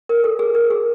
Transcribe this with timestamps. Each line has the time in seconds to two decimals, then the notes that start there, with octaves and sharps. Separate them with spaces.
0.09 A#4
0.24 A4
0.39 G#4
0.55 A#4
0.70 G#4